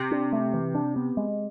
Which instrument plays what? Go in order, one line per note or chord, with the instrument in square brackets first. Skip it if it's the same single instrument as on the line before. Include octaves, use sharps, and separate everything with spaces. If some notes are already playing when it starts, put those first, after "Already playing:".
Already playing: [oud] C3
[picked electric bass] D4
A3
E3
D4
B3
G#3